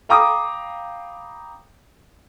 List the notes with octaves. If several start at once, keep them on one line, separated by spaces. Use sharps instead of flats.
F5 G5 A#5 B5 D6 D#6